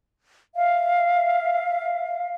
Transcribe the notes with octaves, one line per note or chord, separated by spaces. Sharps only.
E5 F5